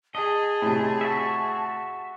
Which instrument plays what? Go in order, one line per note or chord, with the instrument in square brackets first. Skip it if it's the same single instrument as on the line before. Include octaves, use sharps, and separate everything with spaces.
[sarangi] G#4 [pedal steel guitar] D#5 [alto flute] A5
[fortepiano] A2 C3
[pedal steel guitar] F#4 E5